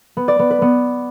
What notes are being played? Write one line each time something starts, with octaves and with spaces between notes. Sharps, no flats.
B3
D5
B3
B4
B3